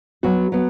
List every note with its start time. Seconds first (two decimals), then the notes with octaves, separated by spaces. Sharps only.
0.23 F#3 B3 F#4
0.52 F#3 B3